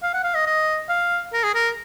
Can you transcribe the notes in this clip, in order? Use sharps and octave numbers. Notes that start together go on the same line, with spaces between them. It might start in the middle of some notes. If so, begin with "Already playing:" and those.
F5
F#5
F5
D#5
D#5
F5
A#4
G#4
A#4